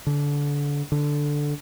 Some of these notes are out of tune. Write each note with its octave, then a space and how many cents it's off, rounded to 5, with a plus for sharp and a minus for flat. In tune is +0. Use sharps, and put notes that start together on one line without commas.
D3 -25
D3 +0